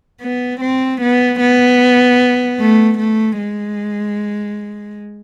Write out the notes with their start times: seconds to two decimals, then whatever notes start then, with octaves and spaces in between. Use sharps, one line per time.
0.21 B3
0.61 C4
1.01 B3
1.40 B3
2.60 A3
2.99 A3
3.38 G#3